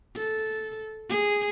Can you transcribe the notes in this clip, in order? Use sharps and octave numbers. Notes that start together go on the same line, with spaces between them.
A4
G#4